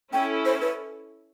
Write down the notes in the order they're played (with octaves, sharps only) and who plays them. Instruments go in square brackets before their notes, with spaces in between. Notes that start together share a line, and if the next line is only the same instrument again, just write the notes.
[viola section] C#4 E4 A4 [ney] G5
[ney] C5
B4